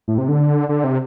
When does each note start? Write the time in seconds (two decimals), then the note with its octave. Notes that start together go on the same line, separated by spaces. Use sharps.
0.08 A2
0.18 C3
0.29 D3
0.69 D3
0.84 C3